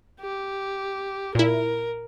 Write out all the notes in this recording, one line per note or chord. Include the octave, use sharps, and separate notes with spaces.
G4
A#2 E4 A#4